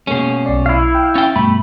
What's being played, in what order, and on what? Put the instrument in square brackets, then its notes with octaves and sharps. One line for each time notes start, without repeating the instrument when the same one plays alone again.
[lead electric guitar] B2 C#4 [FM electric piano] G#3 A#3 C7
[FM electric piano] B1 D5
[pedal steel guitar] E4 F5
[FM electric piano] G5
[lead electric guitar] C#4 G5 [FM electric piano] A6
[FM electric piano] G2 B2 [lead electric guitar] A3 [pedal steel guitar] B5